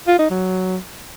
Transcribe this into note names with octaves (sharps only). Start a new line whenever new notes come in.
F4
D#4
F#3